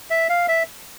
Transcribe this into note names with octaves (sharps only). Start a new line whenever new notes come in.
E5
F5
E5